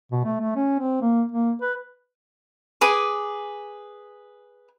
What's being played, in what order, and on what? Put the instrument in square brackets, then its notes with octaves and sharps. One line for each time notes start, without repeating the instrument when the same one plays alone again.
[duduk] B2
A3
A3
C#4
C4
A#3
A#3
B4
[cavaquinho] G#4 B4 G#5 D6